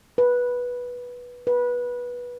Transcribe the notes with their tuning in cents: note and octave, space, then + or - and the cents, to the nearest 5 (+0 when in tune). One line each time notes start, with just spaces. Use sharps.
B4 -10
B4 -15